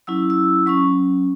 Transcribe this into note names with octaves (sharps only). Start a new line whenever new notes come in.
F#3 C#4 E4 E6
E6
F#3 C#4 C#6